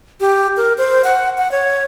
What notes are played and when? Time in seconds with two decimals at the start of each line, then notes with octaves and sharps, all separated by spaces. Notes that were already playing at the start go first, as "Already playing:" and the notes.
0.20 G4
0.57 A#4
0.78 C5
1.04 F#5
1.38 F#5
1.51 C#5